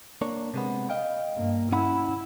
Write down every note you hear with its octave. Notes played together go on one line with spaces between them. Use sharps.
A#3 D4 C#5
C3 G#3 B3
D#5 F5 G5
G2 A#3
C#4 E4 F#5 B5